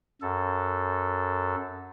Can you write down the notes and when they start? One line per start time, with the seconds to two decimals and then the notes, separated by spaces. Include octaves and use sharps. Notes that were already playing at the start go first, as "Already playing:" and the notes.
0.22 F#2 A4